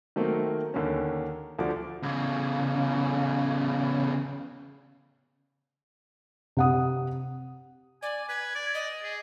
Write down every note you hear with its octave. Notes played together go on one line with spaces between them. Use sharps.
D#3 F#3 A3 A#3 C4
D#2 D3 A#3 C#4
D2 F3 F#4 D5 D6
E2 C#3
C3 F#5 D#6
D5 G#5
B4 G#6
D5
D#5
G#4